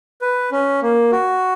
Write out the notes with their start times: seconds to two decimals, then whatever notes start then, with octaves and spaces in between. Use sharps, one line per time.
0.21 B4
0.52 C#4
0.82 A#3
1.12 F#4